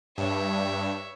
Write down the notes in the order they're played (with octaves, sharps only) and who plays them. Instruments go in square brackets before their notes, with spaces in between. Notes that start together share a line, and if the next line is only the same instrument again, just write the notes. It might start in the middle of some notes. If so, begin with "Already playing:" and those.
[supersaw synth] G2 [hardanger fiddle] C#5 E5